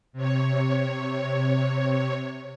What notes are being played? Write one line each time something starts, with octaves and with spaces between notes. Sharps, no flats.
C3 C#5